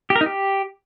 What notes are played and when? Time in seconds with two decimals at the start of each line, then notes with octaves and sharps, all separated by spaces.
0.10 G4
0.16 A#4
0.21 D#4
0.26 G4